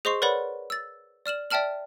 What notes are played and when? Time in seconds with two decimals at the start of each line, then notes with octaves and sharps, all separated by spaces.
0.05 G#4 C5 D#5 C6 C#6 C7
0.22 A#4 B4 C#5 D5 F#5 B5
0.70 E6 A6
1.26 D5 F6 E7 F#7
1.50 D5 E5 G5 A5 F6 F#7